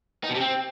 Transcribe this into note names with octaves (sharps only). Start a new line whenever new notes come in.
D#4
B2
C3
C4